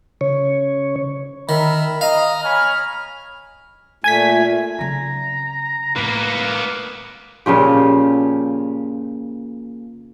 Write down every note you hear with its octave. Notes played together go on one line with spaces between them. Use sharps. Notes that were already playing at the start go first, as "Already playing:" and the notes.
C#3 C#5
D#3 A#4 E5 B5
D#5 F5 A#5
C#5 G#5 B5 F6
A#2 A3 G#5 G#6 B6
C#3 F#3 A#5
A2 A#3 B3 E4 B4
A#2 C#3 F3 G4